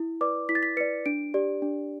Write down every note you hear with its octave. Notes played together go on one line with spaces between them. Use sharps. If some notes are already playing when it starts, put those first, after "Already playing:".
Already playing: E4
B4 D5 D6
E4 B6
A6
B6
B4 D5 C#7
D4 D7
G4 D5
D4